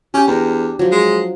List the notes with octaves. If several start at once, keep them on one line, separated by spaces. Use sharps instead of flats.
C#4 G4 G5
E2 D4 A#4
F3 F#3
G#3